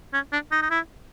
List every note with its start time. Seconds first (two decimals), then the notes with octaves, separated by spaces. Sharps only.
0.14 C#4
0.32 D4
0.52 D#4
0.62 D#4
0.71 E4